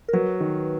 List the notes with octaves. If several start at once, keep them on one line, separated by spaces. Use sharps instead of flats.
A#4
F#3 B4
D#3